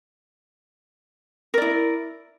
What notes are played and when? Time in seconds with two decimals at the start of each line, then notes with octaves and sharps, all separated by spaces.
1.54 A#4
1.58 D5
1.62 E4